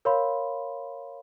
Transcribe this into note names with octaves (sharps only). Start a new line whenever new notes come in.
A#4 C#5 F5 B5 C6